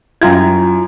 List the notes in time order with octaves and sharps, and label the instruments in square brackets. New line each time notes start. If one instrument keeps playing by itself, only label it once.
[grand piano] F#2 G5 G#6 [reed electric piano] E4 F4 A#5